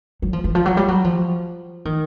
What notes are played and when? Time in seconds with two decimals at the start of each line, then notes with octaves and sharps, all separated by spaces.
0.22 F#3
0.33 F3
0.44 E3
0.55 F3
0.66 F#3
0.77 G3
0.88 F#3
1.05 F3
1.85 D#3